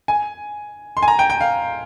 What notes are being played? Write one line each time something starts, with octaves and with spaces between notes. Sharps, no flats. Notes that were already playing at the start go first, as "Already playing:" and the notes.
G#5
C6
G#5
A#5
G5
G5
F5